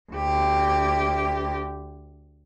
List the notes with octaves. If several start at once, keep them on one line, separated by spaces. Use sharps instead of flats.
D2 G4